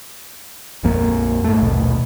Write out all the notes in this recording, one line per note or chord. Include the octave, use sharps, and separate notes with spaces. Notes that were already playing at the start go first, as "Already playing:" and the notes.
A#1 F2 A#3
G#2 A3
A#1 D#2 B2